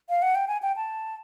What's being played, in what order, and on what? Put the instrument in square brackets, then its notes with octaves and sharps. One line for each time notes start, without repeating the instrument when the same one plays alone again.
[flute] F5
F#5
G5
G#5
G5
A5